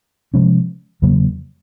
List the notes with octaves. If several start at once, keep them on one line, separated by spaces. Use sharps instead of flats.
C3 F3 G#3 C#4
E2 C#3 F#3 A#3